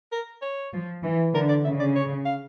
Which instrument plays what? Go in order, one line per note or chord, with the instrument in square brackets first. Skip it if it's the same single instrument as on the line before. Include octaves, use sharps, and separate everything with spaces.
[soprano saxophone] A#4
C#5
[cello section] F3
E3
[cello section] D3 [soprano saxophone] A#4
[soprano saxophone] D5
[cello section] C#3 [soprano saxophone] E5
[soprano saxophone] D5
C#5
F5